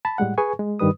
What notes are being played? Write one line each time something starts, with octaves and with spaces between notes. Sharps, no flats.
A5 B5
A2 G3 G#3 F#5
G#4 B4 G#5 C#6
G#3
G2 D#3 G3 B4 D#6